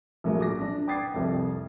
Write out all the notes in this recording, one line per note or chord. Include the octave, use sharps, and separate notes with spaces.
A#1 A2 F3 F#3 A#3
D6 A#6
D4
G5 D6 D#6 G#6 A6 C7
C2 F2